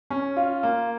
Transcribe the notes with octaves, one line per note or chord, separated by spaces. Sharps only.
C#4
F4
A#3